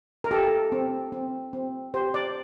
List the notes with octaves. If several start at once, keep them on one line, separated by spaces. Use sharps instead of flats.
A#4
G4 A4
C4
C4
C4
G4 C5
D5